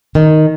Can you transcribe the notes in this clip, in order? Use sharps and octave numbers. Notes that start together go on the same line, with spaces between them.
D#3